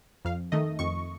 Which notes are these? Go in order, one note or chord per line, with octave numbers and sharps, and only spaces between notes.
F2 F5
D#3 A3 D#5
F2 C#6